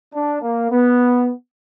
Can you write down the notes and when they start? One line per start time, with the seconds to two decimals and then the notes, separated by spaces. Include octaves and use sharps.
0.14 D4
0.42 A#3
0.71 B3